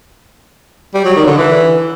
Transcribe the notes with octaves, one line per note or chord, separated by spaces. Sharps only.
G3
F#3
D#3
D3
E3